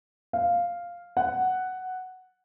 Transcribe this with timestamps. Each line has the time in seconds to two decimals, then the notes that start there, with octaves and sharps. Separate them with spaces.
0.33 F5
1.17 F#5